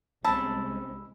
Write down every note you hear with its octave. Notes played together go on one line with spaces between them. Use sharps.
C2 G#3 C4 C#4 D#4 A5 B5 E6